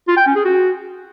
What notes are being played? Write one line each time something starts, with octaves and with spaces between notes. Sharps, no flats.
F4
G5
C#4
G#4
F#4